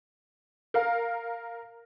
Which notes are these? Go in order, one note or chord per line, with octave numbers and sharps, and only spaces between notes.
A#4 F5